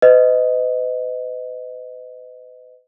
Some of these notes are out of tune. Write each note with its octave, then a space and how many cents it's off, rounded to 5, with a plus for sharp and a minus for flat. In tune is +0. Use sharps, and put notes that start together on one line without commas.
B4 +40 D#5 +0